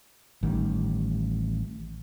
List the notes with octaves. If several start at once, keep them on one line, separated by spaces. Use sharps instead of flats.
A1 D#3 G3